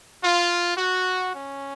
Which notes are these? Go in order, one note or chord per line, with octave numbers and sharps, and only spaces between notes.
F4
F#4
C#4